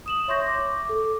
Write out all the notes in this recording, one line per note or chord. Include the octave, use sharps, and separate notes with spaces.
D#6 E7 F#7
C#5 E5 C6 C#6 G6 A#6
D6
A4 D6